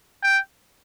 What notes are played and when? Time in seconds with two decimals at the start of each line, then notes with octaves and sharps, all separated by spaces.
0.23 G5